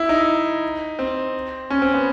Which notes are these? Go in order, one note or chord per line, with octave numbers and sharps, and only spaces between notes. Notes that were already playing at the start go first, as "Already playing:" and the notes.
Already playing: E4
D#4
C4
C#4
C4
B3